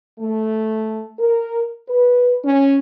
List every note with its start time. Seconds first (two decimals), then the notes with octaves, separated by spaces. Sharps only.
0.20 A3
1.20 A#4
1.88 B4
2.45 C#4